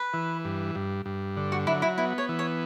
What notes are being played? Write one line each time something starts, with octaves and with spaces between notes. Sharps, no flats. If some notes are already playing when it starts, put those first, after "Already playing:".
Already playing: B4
E3
G2
G2
G2
D3
F#4
F#3 E4
E4
B3 E4
C#5
E3
C#5